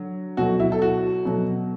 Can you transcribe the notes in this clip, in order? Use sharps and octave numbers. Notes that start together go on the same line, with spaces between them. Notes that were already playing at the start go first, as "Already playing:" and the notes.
Already playing: D3 F#3
B2 F#3 A3 F#4
E4
A4
F#4
B2 F#3 A3